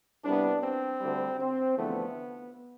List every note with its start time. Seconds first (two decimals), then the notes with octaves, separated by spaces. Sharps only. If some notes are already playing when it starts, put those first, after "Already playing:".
0.24 C2 C3 G3 B3 D4
0.63 C4
1.01 D2 D3 G3
1.39 C4
1.77 E2 D3 F3 A3 B3